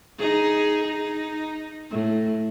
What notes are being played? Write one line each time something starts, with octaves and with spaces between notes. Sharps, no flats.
D#4 G#4
D#4
A2